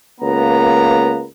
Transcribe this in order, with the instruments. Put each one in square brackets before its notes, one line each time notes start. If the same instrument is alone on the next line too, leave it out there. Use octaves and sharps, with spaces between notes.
[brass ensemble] C#2 A#3 B3 A#5